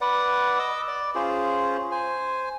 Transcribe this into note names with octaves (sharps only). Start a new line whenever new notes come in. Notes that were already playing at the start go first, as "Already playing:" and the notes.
B4 D5 F#5
D#5 D6 E6
D5
C#4 F4 G#4 C5
C5 G#5